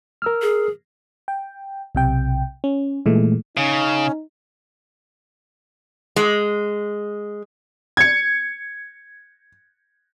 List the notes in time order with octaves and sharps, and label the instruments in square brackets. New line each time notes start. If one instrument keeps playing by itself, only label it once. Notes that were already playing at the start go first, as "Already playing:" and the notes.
[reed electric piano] A#4 E6 F6
[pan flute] G#4
[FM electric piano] G5
B1 C3 G5
C#4
A#2 E3 G#3 A3
[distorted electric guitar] C#3 [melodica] C#4 [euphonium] D#4
[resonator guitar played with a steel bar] G#3
[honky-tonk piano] G#6 C#7